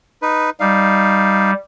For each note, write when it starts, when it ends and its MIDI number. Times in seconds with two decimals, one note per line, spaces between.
0.22 0.50 63
0.22 0.50 71
0.60 1.53 55
0.60 1.51 63
0.60 1.51 77